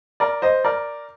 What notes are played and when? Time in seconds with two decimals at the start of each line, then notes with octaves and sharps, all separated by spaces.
0.20 A#4 D5
0.42 C5 D#5
0.64 A#4 D5